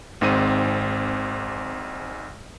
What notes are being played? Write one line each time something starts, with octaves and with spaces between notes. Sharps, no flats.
G#1 G#2 C4 D#7